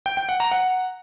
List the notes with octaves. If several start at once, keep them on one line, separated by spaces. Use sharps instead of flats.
G5
G5
F#5
A#5
F#5